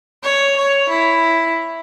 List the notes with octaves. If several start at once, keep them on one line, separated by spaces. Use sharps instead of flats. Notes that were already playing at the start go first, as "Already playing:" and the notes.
C#5
C#5
E4